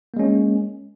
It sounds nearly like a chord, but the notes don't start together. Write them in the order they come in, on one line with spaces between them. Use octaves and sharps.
A#3 G#3 C#4